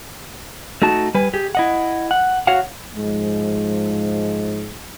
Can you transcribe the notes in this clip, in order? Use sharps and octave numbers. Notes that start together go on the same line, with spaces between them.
A3 D#4 F#4 A5
G3 B4 G#5
G4 G#4
E4 D#5 F#5
F#5
F#4 C#5 F5 F#5
G#2 F3 G#3